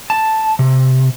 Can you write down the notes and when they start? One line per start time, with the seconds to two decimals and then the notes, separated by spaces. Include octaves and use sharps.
0.10 A5
0.59 C3